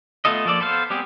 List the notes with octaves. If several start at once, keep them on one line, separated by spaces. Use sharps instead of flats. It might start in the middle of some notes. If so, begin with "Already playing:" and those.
A3 B3 F4 A4 D#5
F3 A#3 A4 D5
B3 A4 C5 F5
G3 B3 C4 G4 G#4